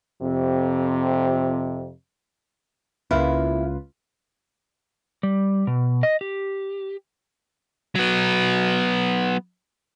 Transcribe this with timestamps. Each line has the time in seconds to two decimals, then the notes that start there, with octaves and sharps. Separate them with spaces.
0.22 F2 C3
3.11 C#2 A#3 E4 F4 B4
5.23 G3
5.67 B2
6.03 D#5
6.21 G4
7.95 F#3 B3